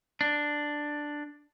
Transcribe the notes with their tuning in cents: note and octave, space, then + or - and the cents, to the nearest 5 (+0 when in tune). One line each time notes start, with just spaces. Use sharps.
D4 +5